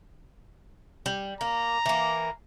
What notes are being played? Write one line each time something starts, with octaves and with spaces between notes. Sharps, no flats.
G3
A#3 A#5
E3 A#3